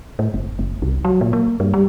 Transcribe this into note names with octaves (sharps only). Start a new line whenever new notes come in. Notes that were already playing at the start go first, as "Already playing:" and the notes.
A2
F#1
F#1
C2
F#3
A#2
A#3
G2
G3